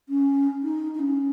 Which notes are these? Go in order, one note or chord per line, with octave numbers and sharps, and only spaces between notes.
C#4
D#4
D#4
C#4